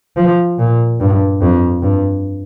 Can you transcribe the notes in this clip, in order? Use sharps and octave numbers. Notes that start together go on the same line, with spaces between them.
F3
A#2
G2
F2
G2